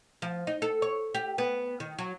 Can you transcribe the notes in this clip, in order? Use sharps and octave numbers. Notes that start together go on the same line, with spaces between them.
F3
D#4
A4
C#5
G4
B3
D#3
F#3